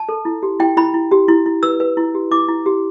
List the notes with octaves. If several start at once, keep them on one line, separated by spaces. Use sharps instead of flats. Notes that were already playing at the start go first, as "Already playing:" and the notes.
Already playing: A5
A4
E4
G4
E4 G5
E4 B5
E4
G4
E4
E4
B4 E6
B4
E4
G4
E4 D6
E4
G4